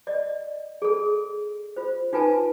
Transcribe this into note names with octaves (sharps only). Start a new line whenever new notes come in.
D5 D#5
G#4 A4
F4 C5
D#4 F4 B4 G#5 A5